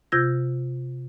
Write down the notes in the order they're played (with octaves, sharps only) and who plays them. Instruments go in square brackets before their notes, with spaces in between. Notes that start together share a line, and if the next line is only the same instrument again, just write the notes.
[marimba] C3 F4 E6 G6 G#6 A#6